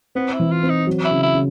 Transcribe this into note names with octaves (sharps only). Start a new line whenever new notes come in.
B3 C4
E4
E3
F4
C4
D#4
F#3
E4
C#3
E4
C#3